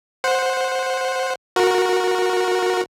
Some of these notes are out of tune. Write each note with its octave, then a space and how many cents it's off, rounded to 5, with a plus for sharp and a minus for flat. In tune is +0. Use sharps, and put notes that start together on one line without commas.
C5 +0 F#5 -10
F#4 -15 A#4 +0